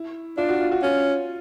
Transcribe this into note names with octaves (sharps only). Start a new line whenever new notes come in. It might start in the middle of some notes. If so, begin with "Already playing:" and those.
Already playing: E4
D4 F4
F#4
F4
F#4
C#4 F4